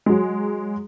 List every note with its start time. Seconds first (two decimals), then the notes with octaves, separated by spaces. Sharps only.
0.06 F#3 G#3